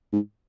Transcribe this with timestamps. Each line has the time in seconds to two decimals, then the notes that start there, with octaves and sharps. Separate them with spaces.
0.12 G#2